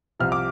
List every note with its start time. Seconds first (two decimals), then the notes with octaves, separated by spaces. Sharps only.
0.19 C2 C3 F3 F6
0.32 D6